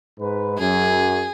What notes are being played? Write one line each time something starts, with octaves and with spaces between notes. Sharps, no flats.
G#2 B4
F#2 F#3 G#4